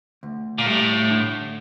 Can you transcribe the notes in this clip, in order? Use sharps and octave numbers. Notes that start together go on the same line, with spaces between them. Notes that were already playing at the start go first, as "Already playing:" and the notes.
D2
A#2
A2 G3
D3